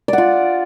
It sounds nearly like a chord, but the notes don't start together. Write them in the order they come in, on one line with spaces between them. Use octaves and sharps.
D5 F#5 F4